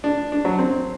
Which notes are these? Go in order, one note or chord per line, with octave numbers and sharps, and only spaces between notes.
D4
D4
F#3
C4